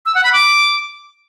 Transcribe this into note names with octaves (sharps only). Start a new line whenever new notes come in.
E6
F#5
B5
D6